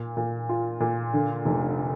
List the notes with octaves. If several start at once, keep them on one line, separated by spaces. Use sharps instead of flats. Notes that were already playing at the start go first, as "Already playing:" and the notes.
Already playing: A#2
A#2
F4
A#2
D3
F1